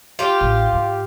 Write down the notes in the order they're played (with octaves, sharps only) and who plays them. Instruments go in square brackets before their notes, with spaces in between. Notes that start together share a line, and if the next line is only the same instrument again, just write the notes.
[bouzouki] F4 G4
[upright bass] A1
G#2